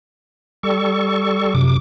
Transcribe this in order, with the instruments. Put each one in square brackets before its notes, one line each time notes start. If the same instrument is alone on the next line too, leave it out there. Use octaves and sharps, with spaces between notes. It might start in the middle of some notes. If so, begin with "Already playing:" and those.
[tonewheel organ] G3 A4 C#6
[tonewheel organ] F#2 D6 [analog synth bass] C3